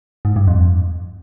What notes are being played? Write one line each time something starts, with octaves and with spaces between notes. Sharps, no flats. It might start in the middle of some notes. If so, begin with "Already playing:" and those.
G#2
G2
F2